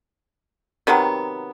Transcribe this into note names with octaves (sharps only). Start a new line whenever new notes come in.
C3 D#3 F#3 B3